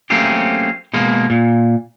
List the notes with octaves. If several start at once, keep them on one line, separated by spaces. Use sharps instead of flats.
F#3 A3 A#3 C4 C#4 G4
B2 G#3 A#3
A#2